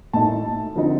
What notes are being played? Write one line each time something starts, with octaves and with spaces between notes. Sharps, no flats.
A2 A3 D#4 A5
D3 F3 C4 D#4